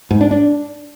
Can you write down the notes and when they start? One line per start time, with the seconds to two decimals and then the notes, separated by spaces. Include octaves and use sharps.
0.11 G#2
0.21 D4
0.31 D4